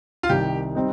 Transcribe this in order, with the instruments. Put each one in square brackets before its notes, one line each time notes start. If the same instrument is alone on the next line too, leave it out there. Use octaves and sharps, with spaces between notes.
[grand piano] F4
[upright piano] C2 C3 D#3 [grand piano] G4
[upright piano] G3 C4 D#4